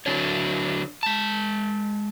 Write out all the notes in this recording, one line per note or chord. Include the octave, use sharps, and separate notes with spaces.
D3 F#3 D4 C#5
G#3 A5